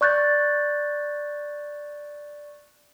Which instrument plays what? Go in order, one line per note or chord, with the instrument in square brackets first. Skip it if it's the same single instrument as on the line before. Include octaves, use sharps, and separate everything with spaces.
[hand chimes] D5 C#6 F#6 G6 A6